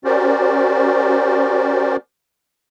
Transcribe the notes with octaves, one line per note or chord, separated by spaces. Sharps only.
C#4 F#4 G4 A#4 C5 D5